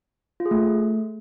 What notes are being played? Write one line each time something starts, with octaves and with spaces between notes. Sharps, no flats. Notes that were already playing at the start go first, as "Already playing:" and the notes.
F4
G#4
A3